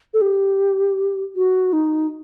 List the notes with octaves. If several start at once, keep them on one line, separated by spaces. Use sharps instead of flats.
A4
G4
F#4
D#4